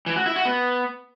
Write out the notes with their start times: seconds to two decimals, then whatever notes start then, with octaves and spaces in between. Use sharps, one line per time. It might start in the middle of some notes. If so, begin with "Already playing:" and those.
0.06 E3
0.16 F#4
0.26 E4
0.36 F#4
0.45 B3